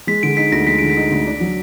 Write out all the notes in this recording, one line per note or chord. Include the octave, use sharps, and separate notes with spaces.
G#3 B6
D3 D7
D#4 B6
D2 A#6
G#3 B6
D3 D7
B6
D#4
D2
D4
F#3